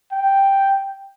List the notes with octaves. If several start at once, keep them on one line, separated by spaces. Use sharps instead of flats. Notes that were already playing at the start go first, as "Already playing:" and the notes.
G5